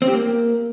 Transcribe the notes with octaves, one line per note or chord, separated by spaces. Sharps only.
C4
G4
A#3